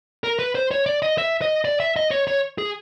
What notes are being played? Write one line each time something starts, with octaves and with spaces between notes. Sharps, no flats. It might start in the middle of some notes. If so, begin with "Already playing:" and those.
A#4
B4
C5
C#5
D5
D#5
E5
D#5
D5
E5
D#5
C#5
C#5
G#4